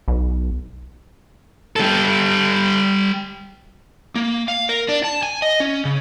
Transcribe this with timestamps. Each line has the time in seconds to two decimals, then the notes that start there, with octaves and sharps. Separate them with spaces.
0.08 B1
1.76 G3 A4
4.15 A#3
4.48 F5
4.69 A#4
4.88 D4
5.04 A5
5.23 G#5
5.42 D#5
5.60 C#4
5.85 C#3